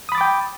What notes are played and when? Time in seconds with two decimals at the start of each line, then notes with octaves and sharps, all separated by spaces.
0.09 D#6
0.12 B5
0.15 A6
0.18 D6
0.21 G5